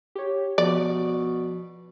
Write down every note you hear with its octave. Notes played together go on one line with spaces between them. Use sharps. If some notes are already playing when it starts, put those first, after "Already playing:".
G4 C#5
B2 F3 D5